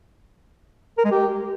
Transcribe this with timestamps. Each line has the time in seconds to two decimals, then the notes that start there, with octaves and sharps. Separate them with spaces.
0.98 A#4
1.05 G#3
1.11 G4